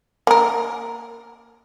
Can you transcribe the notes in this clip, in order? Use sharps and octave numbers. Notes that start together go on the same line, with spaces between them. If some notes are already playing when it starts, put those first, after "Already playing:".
A#3 A#4